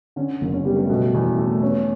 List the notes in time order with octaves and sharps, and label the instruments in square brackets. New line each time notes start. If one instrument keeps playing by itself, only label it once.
[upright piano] D3 [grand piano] C#4
[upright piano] F#1
[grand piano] C#4
[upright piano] G3 [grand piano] B3
[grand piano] A3
[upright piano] B2 [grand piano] B3
[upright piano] E2
A3
[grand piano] B3 [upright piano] C#4